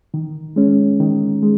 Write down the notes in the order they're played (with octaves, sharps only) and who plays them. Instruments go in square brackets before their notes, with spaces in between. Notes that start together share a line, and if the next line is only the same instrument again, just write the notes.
[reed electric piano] D#3
G#3 C#4
D#3
G#3